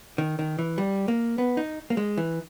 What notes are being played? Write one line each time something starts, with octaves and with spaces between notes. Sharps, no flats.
D#3
D#3
E3
G3
A#3
B3
D#4
A#3
G#3
E3